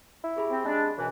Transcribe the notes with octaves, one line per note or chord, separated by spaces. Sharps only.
E4
G4 G#4 B5
C4
G#3 D4
F#2 B2 E3